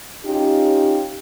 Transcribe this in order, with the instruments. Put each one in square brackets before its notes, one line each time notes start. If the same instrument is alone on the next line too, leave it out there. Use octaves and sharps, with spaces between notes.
[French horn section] C#4 D#4 F4 G4